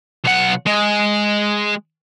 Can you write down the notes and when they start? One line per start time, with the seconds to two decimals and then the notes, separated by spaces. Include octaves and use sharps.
0.25 B1 F#5
0.67 G#3